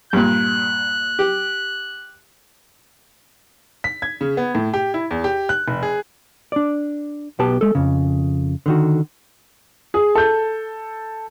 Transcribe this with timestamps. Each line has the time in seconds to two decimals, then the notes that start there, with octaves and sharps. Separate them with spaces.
0.13 G2 A#2 F#6
1.19 G4
3.84 B6
4.02 G#6
4.21 C#3
4.37 B3
4.55 A2
4.74 G4
4.94 E4
5.11 E2
5.24 G4
5.49 F#6
5.68 F1
5.83 G#4
6.52 D4 D5
7.39 B1 B2 B3 G4 A5
7.61 G#3 A4
7.75 F2 C#3
8.66 D3 D#3 F#4
9.94 G#4
10.15 A4 G6